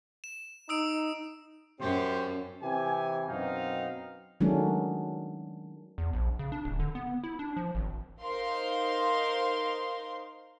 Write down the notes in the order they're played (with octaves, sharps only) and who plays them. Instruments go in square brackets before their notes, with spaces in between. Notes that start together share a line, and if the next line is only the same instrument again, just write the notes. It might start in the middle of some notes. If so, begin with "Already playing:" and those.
[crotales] E7
[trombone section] D#4 [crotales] D#6 E6 D7
[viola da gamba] F#2 [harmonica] C#4 G4 C5
[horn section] C3 E3 G4 G#5
F#2 B2 C4 D#4 F5
[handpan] D#3 F#3 G#3 A3 C#4 D4
[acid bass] E2
A#1
C#3
D4
D1
D3
B3
E4
D4
F3
G#1
[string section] D#4 A#4 C5 F5 C6